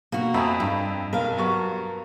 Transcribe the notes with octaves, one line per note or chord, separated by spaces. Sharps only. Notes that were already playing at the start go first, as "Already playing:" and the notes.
B2 A#3 F#4
F2 E5 G#5 A#5 B5 D#6
G2
B1 A#4 F5
G2 F#3 B3 C#6